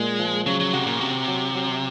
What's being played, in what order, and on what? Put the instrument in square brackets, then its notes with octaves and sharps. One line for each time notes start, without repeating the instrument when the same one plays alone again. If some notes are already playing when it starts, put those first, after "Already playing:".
Already playing: [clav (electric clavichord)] A#2 [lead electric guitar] G#3
[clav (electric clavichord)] F3
[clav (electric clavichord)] C#3 [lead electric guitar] F#3
[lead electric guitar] F#3
[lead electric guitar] C3 [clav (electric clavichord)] F#4
[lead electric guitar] A#2
[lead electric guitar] C3 [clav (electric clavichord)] F#4
[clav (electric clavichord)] F#3
F#3